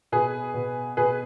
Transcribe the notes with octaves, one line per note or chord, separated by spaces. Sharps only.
B2 G#4 B4
B2
B2 G#4 B4